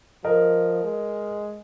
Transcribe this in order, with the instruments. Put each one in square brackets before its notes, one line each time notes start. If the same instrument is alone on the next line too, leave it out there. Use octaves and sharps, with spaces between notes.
[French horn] F3 [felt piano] A#4 D#5
[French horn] G#3